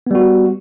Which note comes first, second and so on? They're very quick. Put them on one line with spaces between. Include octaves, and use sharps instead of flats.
B3 G3 F#4